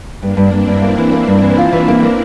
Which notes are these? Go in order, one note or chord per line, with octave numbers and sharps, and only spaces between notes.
G2 A#3 D4
G2
G2 C4 E4
G2
A#3
E3
A#3
G2
E3
F4
E3
A#3
A#3